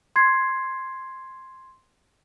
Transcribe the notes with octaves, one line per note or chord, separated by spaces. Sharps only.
C6 G#6 C7